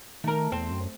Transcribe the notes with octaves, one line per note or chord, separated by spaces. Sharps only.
D#3 A3 A#4
E2 C4
F#2